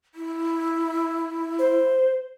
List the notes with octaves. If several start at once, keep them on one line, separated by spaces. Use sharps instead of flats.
E4
C5